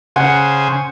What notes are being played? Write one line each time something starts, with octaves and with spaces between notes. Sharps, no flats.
C#3 C5 F#5 G#5